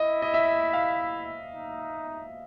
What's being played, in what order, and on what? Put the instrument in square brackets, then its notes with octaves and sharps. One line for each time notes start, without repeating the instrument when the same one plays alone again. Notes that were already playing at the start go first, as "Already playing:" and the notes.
Already playing: [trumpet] E4 [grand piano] D#5
[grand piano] D#5
E5
F5
[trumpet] D#4